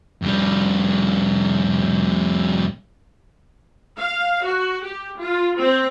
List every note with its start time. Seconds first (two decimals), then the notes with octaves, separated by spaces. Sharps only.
0.22 F2 G3
3.98 F5
4.44 F#4
4.85 G4
5.19 F4
5.60 C4